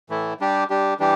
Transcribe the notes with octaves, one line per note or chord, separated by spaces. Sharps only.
A2 E3 A3 E4
G3 D4 G4
G3 D4 G4
E3 G3 D4 G4